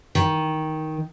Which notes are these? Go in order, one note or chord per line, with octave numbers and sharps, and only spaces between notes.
D#3